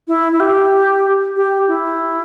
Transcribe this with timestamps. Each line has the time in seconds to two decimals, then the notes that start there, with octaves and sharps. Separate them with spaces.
0.08 E4
0.32 E4
0.40 G4
1.36 G4
1.68 E4